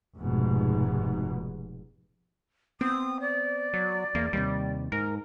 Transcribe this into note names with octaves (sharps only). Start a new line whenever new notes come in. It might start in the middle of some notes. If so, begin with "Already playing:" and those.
F1 G#2 B2
B3 C4 D#6
D5
F#3
E2 A#3
D#2 C3 G3
G#2 A#4